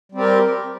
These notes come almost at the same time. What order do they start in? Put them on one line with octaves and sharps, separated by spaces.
G3 C4 G4 A#4